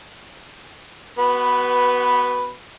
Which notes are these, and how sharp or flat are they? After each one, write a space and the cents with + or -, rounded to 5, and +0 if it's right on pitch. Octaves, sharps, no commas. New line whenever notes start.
B3 -5 F#4 +35 B4 +0